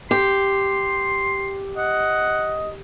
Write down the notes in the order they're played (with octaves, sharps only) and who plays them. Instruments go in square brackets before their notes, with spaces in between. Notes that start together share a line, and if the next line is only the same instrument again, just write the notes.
[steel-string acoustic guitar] G4 [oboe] C6
[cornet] D#5 [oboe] F#5